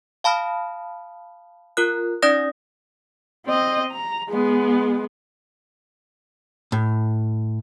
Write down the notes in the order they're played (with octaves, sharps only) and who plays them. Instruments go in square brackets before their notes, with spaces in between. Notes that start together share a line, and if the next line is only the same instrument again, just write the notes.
[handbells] F5 A5 B5 D#6 F6
F4 A#4 F#6
C#4 D#4 D5 D#6 A#6
[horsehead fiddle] C4 D#5
A#5
G#3 B3
[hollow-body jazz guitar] A2